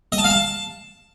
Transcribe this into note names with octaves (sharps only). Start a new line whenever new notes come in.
D#5
A5
F5
A5